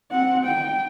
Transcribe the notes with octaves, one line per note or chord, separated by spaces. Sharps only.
C4 F#5
G5